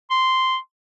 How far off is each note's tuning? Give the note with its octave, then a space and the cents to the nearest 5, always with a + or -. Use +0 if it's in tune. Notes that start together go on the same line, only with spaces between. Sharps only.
C6 -10